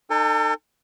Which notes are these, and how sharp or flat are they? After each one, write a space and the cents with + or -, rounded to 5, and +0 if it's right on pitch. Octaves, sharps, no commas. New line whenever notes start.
D#4 -30 A4 +35 G#5 -40